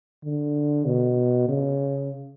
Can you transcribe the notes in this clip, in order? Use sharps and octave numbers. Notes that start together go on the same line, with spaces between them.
D3
B2
C#3